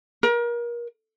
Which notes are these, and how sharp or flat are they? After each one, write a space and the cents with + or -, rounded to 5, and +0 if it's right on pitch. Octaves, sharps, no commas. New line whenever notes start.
A#4 +30